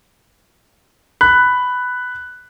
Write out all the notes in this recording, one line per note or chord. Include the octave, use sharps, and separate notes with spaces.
B5 F#6